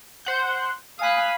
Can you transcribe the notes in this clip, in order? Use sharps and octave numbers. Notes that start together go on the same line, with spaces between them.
C5 F#5 G6
F5 G#5 B5 D#6 F#6